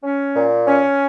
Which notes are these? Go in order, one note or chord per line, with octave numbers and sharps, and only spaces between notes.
C#4
A#2
C#4